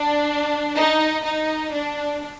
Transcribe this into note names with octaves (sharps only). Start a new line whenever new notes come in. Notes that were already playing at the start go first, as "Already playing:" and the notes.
Already playing: D4
D#4
D#4
D4